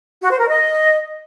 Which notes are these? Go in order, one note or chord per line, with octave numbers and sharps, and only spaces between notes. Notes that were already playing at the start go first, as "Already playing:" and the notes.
F#4
C5
A#4
D#5